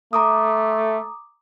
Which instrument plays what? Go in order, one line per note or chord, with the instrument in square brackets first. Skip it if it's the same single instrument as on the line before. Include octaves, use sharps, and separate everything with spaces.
[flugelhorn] A3 [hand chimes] A#5 D6 D#6